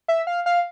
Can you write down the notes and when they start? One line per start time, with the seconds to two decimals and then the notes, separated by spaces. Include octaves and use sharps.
0.08 E5
0.27 F5
0.46 F5